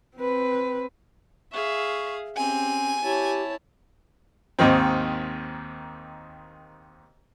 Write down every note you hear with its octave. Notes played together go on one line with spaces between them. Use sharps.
C4 B4
G#4 E5 F5 C#6
C4 C#4 G4 G#5
E4 G4 C#5 A5
D#2 G#2 D#3 C4